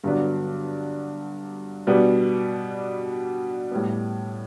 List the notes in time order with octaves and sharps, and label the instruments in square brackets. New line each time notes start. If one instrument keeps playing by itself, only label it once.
[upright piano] G2 D3 F#3 B3 D4
B2 G3 B3 D4
A2 G3 B3